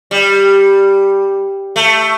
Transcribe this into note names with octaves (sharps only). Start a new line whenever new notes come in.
G3
A3